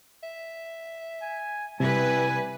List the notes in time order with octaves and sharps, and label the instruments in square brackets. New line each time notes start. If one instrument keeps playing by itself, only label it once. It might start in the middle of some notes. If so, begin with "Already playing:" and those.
[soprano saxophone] E5
[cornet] G#5
[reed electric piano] C3 [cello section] G3 B4 [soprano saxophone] E4 [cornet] G#5